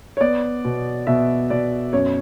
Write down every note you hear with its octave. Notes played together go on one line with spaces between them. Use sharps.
C#5
B3 D5
B2
B2 E5
B2 D5
F#2 C#5